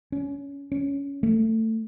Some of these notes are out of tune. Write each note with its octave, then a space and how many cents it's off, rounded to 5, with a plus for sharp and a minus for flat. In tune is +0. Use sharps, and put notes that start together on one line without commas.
C#4 +25
C#4 +15
A3 +20